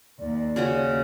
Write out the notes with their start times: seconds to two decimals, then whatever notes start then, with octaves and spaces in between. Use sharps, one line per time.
0.20 D#2 D5
0.56 C#3 F#4 D#5